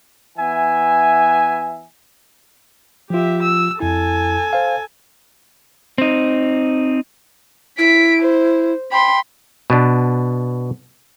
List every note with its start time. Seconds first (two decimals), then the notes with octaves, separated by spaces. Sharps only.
0.37 E3 B3 E5 G#5
3.10 F3 F4 G4 E5
3.42 E6
3.80 F2 E4 A4 G#5
4.53 C5 F5
5.98 C4 D#4
7.79 E4 B6 D7
8.22 C5
8.92 G5 B5 C6
9.70 B2 B3 D4